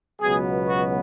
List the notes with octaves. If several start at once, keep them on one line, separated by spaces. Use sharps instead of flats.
C#2 B2 F#3 B3 G#4
F#4